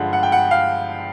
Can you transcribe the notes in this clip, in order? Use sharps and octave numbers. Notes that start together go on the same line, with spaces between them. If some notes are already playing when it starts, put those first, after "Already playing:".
Already playing: G2 D3 F3 G#3 F#5
F#5
G5
F#5
F5